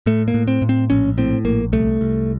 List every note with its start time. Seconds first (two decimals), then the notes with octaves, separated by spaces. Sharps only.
0.06 A2 A3
0.28 A#3
0.34 A2
0.48 C4
0.62 A2
0.69 C4
0.90 A#1 C#4
1.18 A2 C4
1.45 A#1 A#3
1.72 C2 A3
2.01 C2